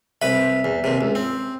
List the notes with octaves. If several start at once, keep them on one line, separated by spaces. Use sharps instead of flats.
C2 B4 E5 B5
E2
D#2 C3
C#2
C4